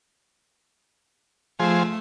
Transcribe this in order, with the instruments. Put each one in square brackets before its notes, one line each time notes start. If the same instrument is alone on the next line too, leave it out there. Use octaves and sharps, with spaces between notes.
[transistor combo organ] F3 G#4 C5 [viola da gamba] A3